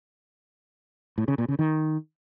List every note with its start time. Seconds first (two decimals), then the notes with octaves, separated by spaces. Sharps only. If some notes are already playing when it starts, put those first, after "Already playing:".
1.18 A2
1.28 C#3
1.38 A#2
1.48 C#3
1.59 D#3